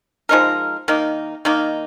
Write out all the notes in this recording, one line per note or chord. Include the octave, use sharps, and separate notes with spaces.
F3 G#3 D#4 A#4
D#3 A#3 D#4
D#3 A#3 D#4